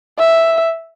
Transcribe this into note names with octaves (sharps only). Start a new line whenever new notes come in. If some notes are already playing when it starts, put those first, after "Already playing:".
E5